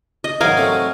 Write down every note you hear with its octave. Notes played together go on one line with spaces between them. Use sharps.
D#5
G#2 F#3 A#4 F5 G#5
C3 F#3 A3